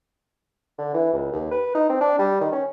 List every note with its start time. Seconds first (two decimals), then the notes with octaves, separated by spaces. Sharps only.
0.79 D3
0.94 E3
1.14 C#2
1.32 D#2
1.51 B4
1.75 D#4
1.89 C4
2.01 D4
2.19 G3
2.41 D#3
2.53 C#4